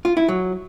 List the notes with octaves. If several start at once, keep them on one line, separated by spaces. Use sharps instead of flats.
F4
E4
F#3